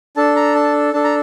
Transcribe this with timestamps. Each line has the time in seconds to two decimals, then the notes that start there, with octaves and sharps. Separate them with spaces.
0.17 D4 A4 A5
0.36 A#5
0.55 A5
0.93 D4 A4 A5
1.04 A#5